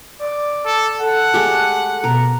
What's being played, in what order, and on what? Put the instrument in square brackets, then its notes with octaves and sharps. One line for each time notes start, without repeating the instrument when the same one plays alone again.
[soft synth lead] D5
[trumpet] A4
[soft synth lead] A4 [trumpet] F#5
[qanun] G#3 A3 G4
[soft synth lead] B2 [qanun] A#4